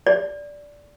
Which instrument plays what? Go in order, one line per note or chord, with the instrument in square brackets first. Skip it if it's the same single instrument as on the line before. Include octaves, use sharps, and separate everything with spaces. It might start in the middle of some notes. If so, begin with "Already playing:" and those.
[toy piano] D5